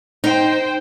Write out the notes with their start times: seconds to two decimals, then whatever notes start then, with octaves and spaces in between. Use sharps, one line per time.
0.24 D#4 C5 G5